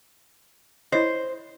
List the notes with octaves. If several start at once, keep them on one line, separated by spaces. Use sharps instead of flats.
E4 C5 C#5 D#5